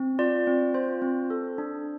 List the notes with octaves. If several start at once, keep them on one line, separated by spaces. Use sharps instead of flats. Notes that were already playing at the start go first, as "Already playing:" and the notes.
Already playing: C4
F4 D5
C4
F4 C5
C4
A4
D4